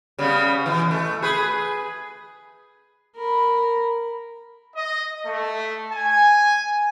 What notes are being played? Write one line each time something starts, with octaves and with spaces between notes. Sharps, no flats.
C#3 G3 B3
B2 E3
A3
G#4 B4
A#4 B5
D#5
A3
G#5